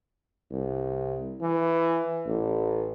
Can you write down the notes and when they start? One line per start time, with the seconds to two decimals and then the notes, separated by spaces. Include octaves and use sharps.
0.51 C2
1.41 E3
2.26 A1